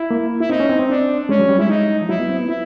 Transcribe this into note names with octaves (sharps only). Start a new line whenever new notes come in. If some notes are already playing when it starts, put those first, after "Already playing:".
Already playing: E4
A#3
E4
C4 D#4
C#4
C4
C4
D4
G#3 C#4
F#3
G3
G#3 E4
D#4
F3
F#3 E4
B3
C4
B3
E4